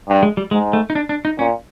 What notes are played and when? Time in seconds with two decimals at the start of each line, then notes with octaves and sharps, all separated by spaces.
0.08 G2
0.23 G#3
0.37 G3
0.51 G#2 G#3
0.73 A3
0.90 D#4
0.95 D4
1.09 D4
1.25 D#4
1.39 A#2 C#4